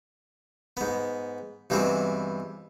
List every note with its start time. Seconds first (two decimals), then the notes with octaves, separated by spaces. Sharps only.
0.77 G#2 B3
1.70 G2 B2 E3 G#3 C4